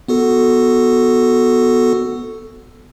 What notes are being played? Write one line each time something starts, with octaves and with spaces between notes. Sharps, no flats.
B3 F#4 A4